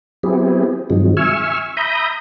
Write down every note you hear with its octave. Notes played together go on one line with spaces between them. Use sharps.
F#3 B3 C4 E4 G4 G#4
G2 C3 D#3 F3 F#3 G#3
E5 G#5 C#6 E6 F6
E5 A#5 B5 D#6 G6